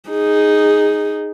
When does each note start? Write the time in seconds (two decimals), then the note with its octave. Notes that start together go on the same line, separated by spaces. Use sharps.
0.11 D#4 G#4